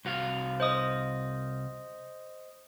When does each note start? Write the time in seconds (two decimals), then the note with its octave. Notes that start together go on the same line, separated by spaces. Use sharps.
0.05 C2 F#4 F5
0.60 C5 D#5 D#6